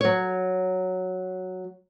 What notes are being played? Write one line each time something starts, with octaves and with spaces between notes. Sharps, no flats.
F#3 C#5